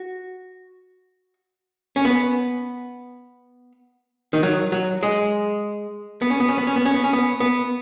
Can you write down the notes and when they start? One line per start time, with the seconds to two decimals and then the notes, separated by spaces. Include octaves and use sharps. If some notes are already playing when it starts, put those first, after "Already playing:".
Already playing: F#4
1.96 C#4
2.05 B3
4.33 D#3
4.43 F#3
4.72 F#3
5.03 G#3
6.22 B3
6.30 C#4
6.40 B3
6.48 C#4
6.58 B3
6.67 C#4
6.76 B3
6.85 C#4
6.94 B3
7.04 C#4
7.13 B3
7.40 B3